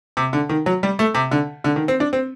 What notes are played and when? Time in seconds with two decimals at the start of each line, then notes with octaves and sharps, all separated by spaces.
0.17 C3
0.33 D3
0.49 D#3
0.66 F#3
0.83 G3
0.99 A3
1.14 C3
1.31 D3
1.64 D3
1.76 D#3
1.88 C4
2.00 D4
2.13 C4